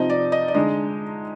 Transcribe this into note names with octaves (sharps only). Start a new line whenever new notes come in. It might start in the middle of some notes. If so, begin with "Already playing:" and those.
Already playing: C3 F3 C4 D#4 D#5
D5
D#5
D5
D3 G#3 D#4 D#5